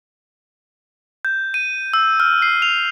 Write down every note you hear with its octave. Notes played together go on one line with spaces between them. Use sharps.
G6
D#7
E6
F6
C7
F7